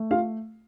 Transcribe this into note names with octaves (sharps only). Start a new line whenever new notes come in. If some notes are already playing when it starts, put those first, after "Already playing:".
Already playing: A3
F4 F5